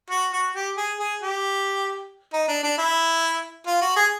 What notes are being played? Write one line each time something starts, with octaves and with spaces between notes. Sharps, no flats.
F#4
F#4
G4
G#4
G#4
G4
D#4
D4
D4
E4
F4
F#4
G#4